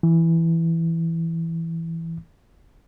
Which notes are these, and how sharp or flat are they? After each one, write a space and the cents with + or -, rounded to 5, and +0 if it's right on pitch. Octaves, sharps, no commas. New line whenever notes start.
E3 +5